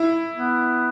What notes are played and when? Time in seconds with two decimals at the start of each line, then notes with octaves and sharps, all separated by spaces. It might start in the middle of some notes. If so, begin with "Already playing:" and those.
Already playing: E4
0.35 B3